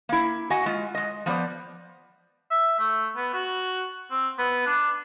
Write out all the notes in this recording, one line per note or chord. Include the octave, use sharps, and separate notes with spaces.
A#3 E4
F#4 D#5 F#5 G#5
G#3 F4
G#3 D#5
F3 B3 C5 D5
E5
A3
B3
F#4
C4
B3
D4